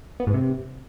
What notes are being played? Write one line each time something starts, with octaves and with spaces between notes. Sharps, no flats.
B3
G#2
C3